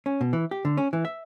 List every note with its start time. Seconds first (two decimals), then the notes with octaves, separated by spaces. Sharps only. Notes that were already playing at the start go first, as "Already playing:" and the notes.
0.06 C#4
0.21 B2
0.33 E3
0.51 G4
0.65 D3
0.77 C#4
0.93 E3
1.05 E5